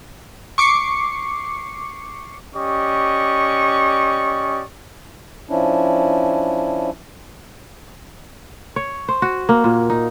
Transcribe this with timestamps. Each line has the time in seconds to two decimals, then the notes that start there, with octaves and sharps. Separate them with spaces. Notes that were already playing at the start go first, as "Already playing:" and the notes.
0.58 C#6 D6 C7 C#7
2.55 C#4 G4 D5 D#5 C#6
5.49 F3 C#4 D4 E4
8.76 C#5
9.08 C5
9.22 F#4
9.49 A#3
9.64 A#2
9.90 D#4